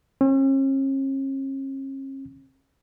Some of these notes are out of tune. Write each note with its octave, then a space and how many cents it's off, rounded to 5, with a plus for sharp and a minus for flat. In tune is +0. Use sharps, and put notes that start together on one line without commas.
C#4 -45